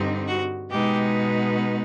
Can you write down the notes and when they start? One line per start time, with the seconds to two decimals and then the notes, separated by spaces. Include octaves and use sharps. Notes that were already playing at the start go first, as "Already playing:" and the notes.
Already playing: G2 D3 G3 C4 D#4
0.27 F#4
0.70 B2 G#3 B3 D#4 G4